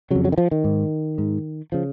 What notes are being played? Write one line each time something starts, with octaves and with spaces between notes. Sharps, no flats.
F2 C#3 F#3
F#3
D#3
F3
D#3
G#2
G#2
C#3 F3